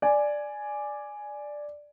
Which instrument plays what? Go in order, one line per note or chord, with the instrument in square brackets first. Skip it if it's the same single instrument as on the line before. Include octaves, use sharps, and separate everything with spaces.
[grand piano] D5 G#5